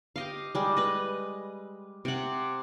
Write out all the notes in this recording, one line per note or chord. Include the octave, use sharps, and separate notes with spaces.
G4 D#5 F5
G3 G#3
B4 D#5
C3 F#5